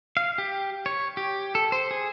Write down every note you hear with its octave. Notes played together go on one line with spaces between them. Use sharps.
F5
G4
C#5
G4
A4
C5
G#4